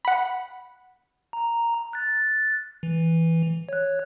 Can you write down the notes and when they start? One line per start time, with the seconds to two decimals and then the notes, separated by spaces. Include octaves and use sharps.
0.05 F#5 B5
1.33 A#5
1.93 F#6 A6
2.83 E3
3.69 C#5 F#6